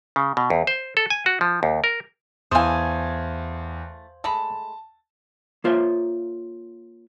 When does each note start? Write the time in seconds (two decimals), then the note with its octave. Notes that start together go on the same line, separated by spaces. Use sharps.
0.16 C#3
0.37 B2
0.50 E2
0.67 C5
0.97 A4
1.10 G#5
1.26 F#4
1.41 F3
1.63 D#2
1.84 A#4
2.51 E2 E3 A3 C5 F5 G#5 D#6
4.24 G#3 A3 A5 B5
5.64 A#3 F4 C5 C#5 E5